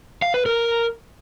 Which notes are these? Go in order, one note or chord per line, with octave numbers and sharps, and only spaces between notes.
F5
B4
A#4